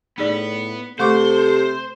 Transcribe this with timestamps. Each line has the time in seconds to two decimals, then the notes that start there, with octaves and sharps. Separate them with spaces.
0.18 A2 B3 D#4 G#4 D5
1.00 C3 A3 A4 C5 C#6 D6